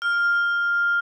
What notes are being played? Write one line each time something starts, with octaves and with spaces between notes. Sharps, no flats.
F6